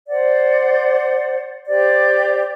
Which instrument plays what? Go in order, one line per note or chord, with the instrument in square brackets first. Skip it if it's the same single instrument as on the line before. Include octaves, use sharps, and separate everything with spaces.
[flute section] C5 D5 F#5
G4 C5 D5